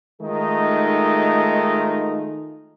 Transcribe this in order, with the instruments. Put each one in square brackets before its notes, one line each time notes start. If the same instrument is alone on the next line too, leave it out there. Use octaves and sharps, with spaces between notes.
[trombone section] D#3 G#3 A3 D#4 F4